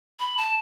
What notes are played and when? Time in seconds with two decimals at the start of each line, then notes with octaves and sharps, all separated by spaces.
0.20 B5
0.37 A5